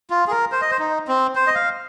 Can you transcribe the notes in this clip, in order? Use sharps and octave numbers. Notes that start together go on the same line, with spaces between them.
F4
G#4
A#4
C5
D#5
C5
D#4
C4
C5
D#5
F5